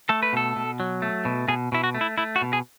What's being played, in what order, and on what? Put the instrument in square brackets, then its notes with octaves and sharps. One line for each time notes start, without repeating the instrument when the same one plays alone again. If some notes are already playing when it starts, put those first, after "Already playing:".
[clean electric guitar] A3 A4
B4
B2 A4
B2
F#3
A3
B2
B2 G#4
B2 E4
F#4
A3
E4
A3 E4
F#4
B2
G#4